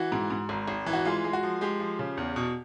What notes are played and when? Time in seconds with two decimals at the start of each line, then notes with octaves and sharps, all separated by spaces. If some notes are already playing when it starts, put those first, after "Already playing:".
Already playing: E3 F#4
0.12 G#2
0.30 G#2
0.49 G#1
0.68 G#1
0.86 E3
0.93 F#4
1.05 G#3 F4
1.24 G#3
1.33 F#4
1.43 F3
1.61 G#3 G4
1.80 F3
1.99 C#3
2.17 E2
2.36 B2